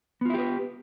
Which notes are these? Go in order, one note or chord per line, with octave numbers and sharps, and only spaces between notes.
B3 E4 F4 G4 B4